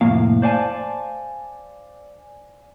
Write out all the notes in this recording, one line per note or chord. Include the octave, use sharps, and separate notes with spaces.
F2 A2 C3 A#3 F5
C5 D5 F5 F#5 G#5 A5